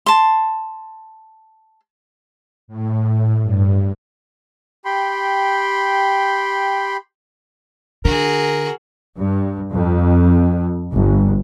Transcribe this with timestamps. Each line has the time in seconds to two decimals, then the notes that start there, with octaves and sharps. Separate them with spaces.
0.06 A5 C6
2.68 A2
3.43 G2
4.85 G4 G5 B5 C6
8.05 D3 F#4 G#4 A#4
9.19 G2
9.73 F2
10.92 G1